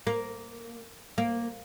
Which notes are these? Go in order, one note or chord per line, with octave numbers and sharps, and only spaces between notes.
A#3
A#3